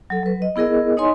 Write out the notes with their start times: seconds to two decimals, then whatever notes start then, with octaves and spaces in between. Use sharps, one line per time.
0.10 F#3 A4
0.23 F#3 B4
0.42 D#5
0.56 B3 E4 G#4 A#4 D#5
0.97 D#4 C#5 D#5 G#5 C6